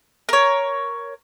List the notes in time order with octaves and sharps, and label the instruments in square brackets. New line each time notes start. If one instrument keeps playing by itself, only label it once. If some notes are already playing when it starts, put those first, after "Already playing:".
[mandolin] A#4 C#5